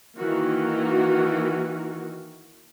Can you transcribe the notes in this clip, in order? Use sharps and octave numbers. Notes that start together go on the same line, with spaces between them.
D#3 E3 A#3 F#4